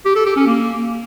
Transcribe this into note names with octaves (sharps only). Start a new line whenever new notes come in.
G4
A4
G4
C#4
A#3